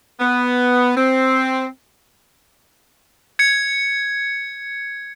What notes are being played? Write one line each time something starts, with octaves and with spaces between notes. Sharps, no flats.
B3
C4
G#6 C#7